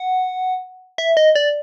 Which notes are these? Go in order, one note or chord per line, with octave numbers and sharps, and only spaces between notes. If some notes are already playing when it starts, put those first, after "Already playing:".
Already playing: F#5
E5
D#5
D5